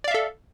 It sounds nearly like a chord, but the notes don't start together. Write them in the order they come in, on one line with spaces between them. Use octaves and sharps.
D5 F5 E5 A4